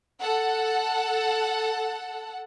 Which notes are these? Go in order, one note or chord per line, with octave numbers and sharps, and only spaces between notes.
A4 F#5